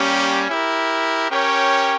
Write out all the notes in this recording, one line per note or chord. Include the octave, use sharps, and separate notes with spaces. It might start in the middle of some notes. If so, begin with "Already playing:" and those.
Already playing: G3 A#3 C#4 G4
E4 G4 A#4
C#4 G4 A#4 C#5 G5